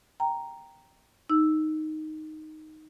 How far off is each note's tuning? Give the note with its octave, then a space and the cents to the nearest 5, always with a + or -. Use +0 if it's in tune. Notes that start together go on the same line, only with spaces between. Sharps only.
G5 +0 A#5 +0
D#4 +0 E6 +0